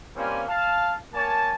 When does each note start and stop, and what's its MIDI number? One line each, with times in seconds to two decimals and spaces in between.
0.15 0.43 55
0.15 0.43 58
0.15 0.43 60
0.15 0.43 61
0.15 0.43 65
0.15 0.43 80
0.48 0.96 77
0.48 0.96 81
1.14 1.54 58
1.14 1.54 73
1.14 1.54 80
1.14 1.54 81